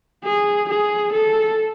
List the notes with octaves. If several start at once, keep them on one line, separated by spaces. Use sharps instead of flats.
G#4
G#4
A4